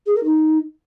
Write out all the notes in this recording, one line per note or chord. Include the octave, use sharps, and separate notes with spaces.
G#4
A#4
D#4